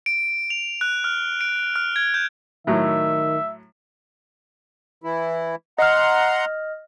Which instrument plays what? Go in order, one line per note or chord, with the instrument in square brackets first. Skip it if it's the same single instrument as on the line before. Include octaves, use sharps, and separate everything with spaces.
[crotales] D7
F7
F#6
F6
D7
F6
G#6
G6
[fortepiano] A2 F#3 [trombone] D#3 [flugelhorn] E5
[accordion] E3 E4
[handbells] D#5 F6 [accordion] F#5 A#5 C6